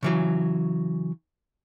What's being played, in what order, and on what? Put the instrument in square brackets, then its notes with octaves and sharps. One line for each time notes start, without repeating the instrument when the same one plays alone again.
[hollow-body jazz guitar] C#3 E3 F#3